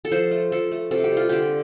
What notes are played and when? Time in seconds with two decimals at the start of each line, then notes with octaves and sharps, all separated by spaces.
0.05 A4
0.12 F3 C5
0.31 A3
0.52 F3 A4
0.72 A3
0.91 C3 A4
1.04 G4
1.12 G3 F4
1.29 D3 G4